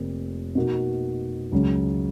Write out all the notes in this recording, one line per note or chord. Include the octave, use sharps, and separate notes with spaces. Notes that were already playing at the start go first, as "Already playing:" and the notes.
Already playing: F1 F2 F3 A#3
B2 A#3 D#4 F#4
C#2 C#3 F#3 C#4